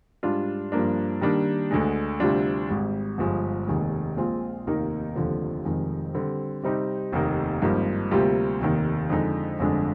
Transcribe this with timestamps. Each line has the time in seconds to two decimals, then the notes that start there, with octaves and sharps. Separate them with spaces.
0.23 G#2 G3 D4 F4
0.72 G2 F3 A#3 D4
1.21 D#3 G3 A#3 D4
1.71 D2 D3 G#3
2.20 D2 C3 G3 D4 F4
2.69 G#1 G#2 G3
3.18 G1 G2 F3 G#3
3.67 F1 D#2 D#3 G#3
4.17 A#1 A#2 G#3 C4 F4
4.66 F1 D#2 D#3 A#3 D#4
5.16 F1 D#2 D3 F3
5.65 F1 F2 D#3 G#3
6.14 D3 G3 C4
6.63 C3 G3 C4 D#4 G4
7.12 F1 D#2 D#3 A#3 D#4
7.62 G#1 G2 F3 A#3 D#4
8.11 D2 C3 G3 A#3 F4
8.60 F1 D#2 D#3
9.10 F2 D3 G#3 D#4
9.59 G1 F2 D3 G#3 D4